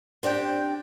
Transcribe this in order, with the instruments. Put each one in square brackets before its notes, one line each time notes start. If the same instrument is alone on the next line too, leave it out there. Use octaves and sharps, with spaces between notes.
[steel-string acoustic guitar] C4 D4 G4 G5